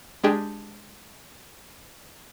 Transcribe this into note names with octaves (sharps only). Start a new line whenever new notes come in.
G#3 D4 G4 G#4